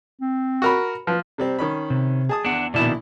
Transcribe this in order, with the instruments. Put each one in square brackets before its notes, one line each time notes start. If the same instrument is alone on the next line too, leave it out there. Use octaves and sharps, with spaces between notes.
[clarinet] C4
[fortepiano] F#4 A#4 B5
[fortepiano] F3 [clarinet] B4
[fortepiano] C3 G3 C4
D#3 C#4 B5
[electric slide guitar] C3
[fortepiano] G#4 A5 D#6
[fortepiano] E2 [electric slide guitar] D4 F#5
[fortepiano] A#1 E4 D5 [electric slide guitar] B2 D#3 A5